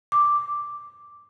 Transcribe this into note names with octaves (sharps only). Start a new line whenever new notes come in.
D6